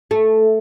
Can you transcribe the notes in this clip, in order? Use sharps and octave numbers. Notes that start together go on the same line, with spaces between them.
A3